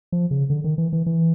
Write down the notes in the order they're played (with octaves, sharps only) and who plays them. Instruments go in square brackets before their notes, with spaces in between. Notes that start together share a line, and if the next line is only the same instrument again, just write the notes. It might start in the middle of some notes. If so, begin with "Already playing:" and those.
[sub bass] F3
C#3
D3
D#3
E3
E3
E3